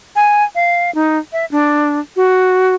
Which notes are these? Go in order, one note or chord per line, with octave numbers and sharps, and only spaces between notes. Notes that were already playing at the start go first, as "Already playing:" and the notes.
G#5
F5
D#4
E5
D4
F#4